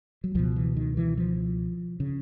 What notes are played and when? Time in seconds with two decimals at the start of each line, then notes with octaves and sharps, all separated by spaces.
0.24 F#3
0.35 C#2 B2 F3
0.56 E3
0.76 D#3
0.97 E3
1.18 F3
2.00 C#3